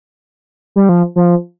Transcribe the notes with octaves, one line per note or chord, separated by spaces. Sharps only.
G3
F3
F3